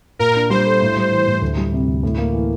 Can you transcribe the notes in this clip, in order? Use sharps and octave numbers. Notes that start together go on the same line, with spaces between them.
A#2 A#4
D4
G3 C5
A4
A2
G3
E3
A2
D2
G3
C3
D2
A2
A#3
E3